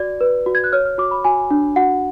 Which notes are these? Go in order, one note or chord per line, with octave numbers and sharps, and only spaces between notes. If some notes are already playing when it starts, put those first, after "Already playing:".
Already playing: F#4 D5
B4
F#4
G#6
F#6
C#5 F6
F6
F#4 D6
B5
F#4 G#5
D4
F#4 F#5